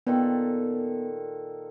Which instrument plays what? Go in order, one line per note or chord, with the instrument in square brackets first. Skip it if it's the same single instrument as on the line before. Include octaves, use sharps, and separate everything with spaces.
[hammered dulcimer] A#2 D#3 A4 [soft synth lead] B3